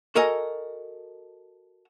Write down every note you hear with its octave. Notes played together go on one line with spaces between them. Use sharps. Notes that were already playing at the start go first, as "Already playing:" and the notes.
F#4 A4 A#4 D#5 G#5